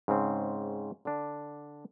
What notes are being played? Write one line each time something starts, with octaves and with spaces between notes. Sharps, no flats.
G#2 C#3 C4
D3 D4